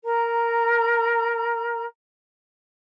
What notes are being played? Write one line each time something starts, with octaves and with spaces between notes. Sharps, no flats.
A#4 A#5